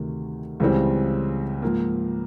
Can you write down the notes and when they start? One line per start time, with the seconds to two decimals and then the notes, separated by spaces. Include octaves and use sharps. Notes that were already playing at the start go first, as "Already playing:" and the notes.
Already playing: D2 C3 D#3
0.60 C#2 C#3 E3 G3 C4
1.62 G#2 F3 A#3